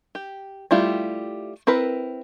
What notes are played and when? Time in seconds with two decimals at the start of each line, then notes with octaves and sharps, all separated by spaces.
0.15 G4
0.71 G3 A3 E4 F4 G4
1.67 C4 E4 A#4 B4